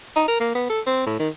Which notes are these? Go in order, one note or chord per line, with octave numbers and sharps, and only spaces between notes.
D#4
A#4
A#3
B3
A4
C4
A2
D#3